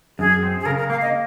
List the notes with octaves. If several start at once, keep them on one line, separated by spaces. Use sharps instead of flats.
F#2 G#4
C4
G#4
C#3 A#4
A#4
A#3 F5
D#5